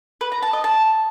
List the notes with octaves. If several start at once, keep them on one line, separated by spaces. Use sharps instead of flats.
B4
A#5
A5
D#5
A5